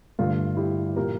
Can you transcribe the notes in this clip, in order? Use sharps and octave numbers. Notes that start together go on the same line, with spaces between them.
G2 D3 A3 F4
E4 G4
A#2 F3 A#3 G4 A#4